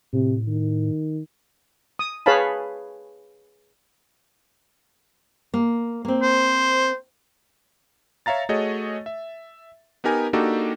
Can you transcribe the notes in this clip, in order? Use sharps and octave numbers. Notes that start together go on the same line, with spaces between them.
A2 C3
D#3
D#6
G#4 B4 C#5 F5 A5 B5
A#3
A#3 C4
C5
C#5 E5 F5 A#5 A6
A3 F#4 G#4 C#5 D#5
E5
B3 D#4 G4 A#4 G#5
A#3 D4 D#4 F#4 G4 A4